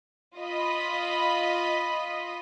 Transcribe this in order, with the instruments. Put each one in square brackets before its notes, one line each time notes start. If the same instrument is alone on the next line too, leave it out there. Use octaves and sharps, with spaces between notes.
[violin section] F4 D#5 B5